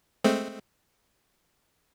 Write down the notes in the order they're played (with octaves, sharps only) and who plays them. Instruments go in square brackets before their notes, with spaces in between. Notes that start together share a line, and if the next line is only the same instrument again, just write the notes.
[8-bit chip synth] G#3 A3 C4